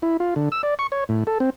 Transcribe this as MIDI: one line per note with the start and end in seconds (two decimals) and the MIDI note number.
0.02 0.17 64
0.20 0.34 65
0.36 0.49 50
0.52 0.62 88
0.63 0.74 74
0.79 0.87 85
0.92 1.04 73
1.09 1.24 45
1.27 1.38 69
1.40 1.50 60